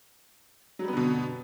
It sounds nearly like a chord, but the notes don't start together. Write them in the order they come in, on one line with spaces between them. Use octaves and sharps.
F#3 G3 B3 D3 B2